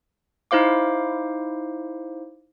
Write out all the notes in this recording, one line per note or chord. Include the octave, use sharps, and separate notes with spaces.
D#4 E4 C5 F5 D6